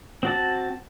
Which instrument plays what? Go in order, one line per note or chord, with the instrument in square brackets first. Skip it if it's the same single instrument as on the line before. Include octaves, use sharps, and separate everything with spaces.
[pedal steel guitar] C4 F#4 A5